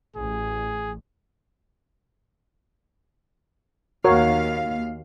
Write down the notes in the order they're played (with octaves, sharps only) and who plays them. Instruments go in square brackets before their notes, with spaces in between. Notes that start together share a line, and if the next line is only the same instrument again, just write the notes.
[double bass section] A1 [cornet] G#4
[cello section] D#2 F5 [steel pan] F#4 A#4 C#5